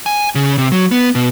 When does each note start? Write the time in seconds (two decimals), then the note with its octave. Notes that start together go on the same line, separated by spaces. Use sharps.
0.06 G#5
0.35 C#3
0.58 C3
0.72 F#3
0.91 B3
1.15 B2